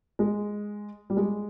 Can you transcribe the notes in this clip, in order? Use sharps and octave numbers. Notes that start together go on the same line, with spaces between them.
G#3
G3
G#3